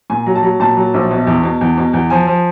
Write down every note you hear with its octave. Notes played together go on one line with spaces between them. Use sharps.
A#2 G#5
F#3
A5
F#3
A#2 A5
F#3
A#1
B2
E2
B2
E2
B2
E2
F3 G#5
F3